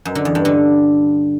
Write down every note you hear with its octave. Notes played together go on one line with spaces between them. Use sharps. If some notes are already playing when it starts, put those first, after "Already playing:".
F#2
D3
E2
G2
D3